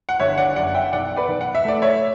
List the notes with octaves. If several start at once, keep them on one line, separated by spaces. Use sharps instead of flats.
F#5
G1 C#5 E5
D5 F#5
F#2 D5 F#5
E5 G5
B1 D5 F#5
B4 D5
B1
F#5
E5
A3 D5
C#5 E5